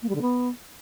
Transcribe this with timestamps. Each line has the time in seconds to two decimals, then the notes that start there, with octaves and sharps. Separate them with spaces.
0.02 A#3
0.08 G3
0.15 D3
0.21 B3